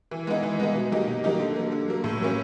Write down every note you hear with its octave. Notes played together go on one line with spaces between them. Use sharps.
E3
G#3 B3 D#4
E3
G#3 B3 D#4
B2
F#3 A#3 D#4 G4
B2
F#3 A#3 D#4 G4
D3
F#3 A#3
D3
F#3 A#3
A2
F#3 A#3 C#4